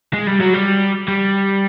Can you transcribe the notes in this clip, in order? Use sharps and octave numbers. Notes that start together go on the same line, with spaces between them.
G#3
G3
F#3
G3
G3